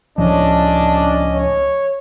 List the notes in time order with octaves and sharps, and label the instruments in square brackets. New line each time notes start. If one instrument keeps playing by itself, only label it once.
[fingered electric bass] C#2 A2 F3 [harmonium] C#4 D#5 [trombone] D4
[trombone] C#5